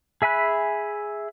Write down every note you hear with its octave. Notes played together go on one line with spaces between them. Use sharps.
G#4 E5 G#5 B5 F#6